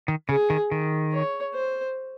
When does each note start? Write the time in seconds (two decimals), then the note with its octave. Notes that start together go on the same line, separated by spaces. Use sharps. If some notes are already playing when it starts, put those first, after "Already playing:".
0.08 D#3
0.29 C#3 G#4
0.50 D#3
0.72 D#3
1.13 C#5
1.55 C5